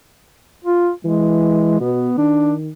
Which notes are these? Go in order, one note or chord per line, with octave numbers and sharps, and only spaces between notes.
F4
E3 G#3
B2 B3
D#3 D4